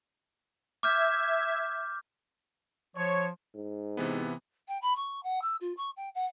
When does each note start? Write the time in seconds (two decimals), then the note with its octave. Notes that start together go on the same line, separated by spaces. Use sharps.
0.83 E5 D6 F6 G6 G#6
2.96 F3 C#5
3.55 G#2
3.97 C3 E3 B3
4.68 G5
4.82 B5
4.96 C#6
5.23 F#5
5.41 E6
5.60 F4
5.77 C#6
5.96 G5
6.14 F#5